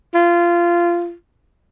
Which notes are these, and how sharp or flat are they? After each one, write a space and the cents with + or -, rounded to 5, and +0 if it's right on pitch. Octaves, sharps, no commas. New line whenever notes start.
F4 -20